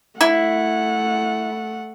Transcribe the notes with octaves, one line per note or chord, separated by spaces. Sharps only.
A3 E4 F#5